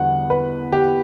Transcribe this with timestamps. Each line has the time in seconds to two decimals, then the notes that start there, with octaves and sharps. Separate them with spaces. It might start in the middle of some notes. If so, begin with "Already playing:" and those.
Already playing: E2 D3 G3 B3 F#5
0.30 B4
0.72 G4